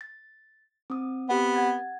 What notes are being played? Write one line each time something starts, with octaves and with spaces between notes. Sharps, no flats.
A6
C4 D#6
B3 C4 G4 F#5
F#5 G#6 A6